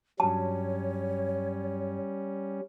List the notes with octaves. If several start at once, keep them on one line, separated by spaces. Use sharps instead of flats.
G2 F#3 G3 C#4 C#5 A5